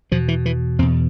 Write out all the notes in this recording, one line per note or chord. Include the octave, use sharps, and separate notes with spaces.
E2 B2 F3
E3
E3
E2 B2 C4